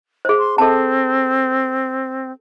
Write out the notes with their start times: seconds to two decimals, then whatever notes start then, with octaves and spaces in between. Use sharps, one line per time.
0.25 G#4 C5
0.39 C6
0.58 C4 A4 A5